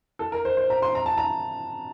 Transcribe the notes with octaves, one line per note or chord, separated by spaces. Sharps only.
A4
A#4
C5
C5
A#5
C6
A#5
A5
A#5